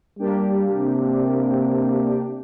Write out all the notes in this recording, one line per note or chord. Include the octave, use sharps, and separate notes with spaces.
G3 A#3 D4 G4
C3